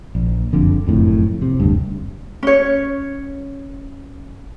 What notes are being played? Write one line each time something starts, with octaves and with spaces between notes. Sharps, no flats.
A#1
F#1 F2 D3
F#1 F2 A2
C3
F#1 D2 G2
C#4 C#5